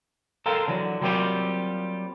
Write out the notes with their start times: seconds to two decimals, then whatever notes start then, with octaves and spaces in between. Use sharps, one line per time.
0.46 A4 A#4 C5 F5 G5
0.68 D3 E3 F#3
1.01 F#3 G3 A#3 C4 F4 G4